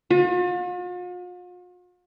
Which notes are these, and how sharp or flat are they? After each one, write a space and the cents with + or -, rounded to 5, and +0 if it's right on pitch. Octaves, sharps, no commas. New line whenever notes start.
F4 +45